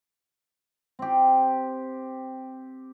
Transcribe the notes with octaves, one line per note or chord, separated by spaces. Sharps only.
C4 G4